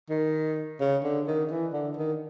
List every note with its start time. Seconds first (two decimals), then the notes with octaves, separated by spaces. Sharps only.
0.10 D#3
0.80 C#3
1.04 D3
1.27 D#3
1.51 E3
1.73 D3
1.96 D#3